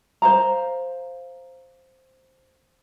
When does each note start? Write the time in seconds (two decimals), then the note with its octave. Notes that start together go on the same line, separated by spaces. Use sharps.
0.22 C5 F5 A#5